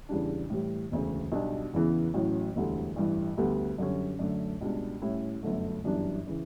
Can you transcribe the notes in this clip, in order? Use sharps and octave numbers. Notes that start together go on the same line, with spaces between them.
E2 C#3 G3 D4
A2 E3 G3
E1 D2 C#3
B1 B2 G3 D4
E2 C#3 E3 B3
A1 A2 F#3 C#4
E1 D2 D3 G3
A1 G2 E3
D2 D3 G3 B3
F#2 D3 G3 C#4
F#2 D3 A3 D4
C#2 B2 G3 D4
A2 G3 C#4 E4
G1 F#2 D3 A3
G1 F#2 E3 G3 D4
C#3 E3